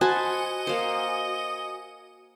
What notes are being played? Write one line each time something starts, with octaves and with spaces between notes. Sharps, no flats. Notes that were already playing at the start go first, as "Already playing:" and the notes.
F#4 C5 D#5 G#5 A5 B5
A#3 C5